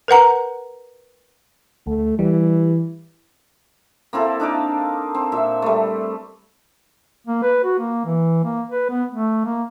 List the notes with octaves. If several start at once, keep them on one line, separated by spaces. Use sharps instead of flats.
A#4 B4 F#5 A#5
D2 A3
E3 G3
A#3 C4 E4 A4
D4 D#4 F5 D6
C4
A#2 E5
G3 A3
A#3
B4
F#4
A#3
E3
A#3
B4
B3
A3
A#3